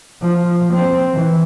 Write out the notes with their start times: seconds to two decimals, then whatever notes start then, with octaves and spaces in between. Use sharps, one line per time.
0.22 F3
0.73 C4
1.14 E3